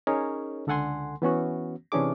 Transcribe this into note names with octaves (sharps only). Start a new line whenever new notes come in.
C#4 D#4 G#4 A#4 C#5
C#2 D3 A4 F#5 G#5 C6
E3 B3 C#4 F#4
C3 E3 C#4 D4 G#4 D6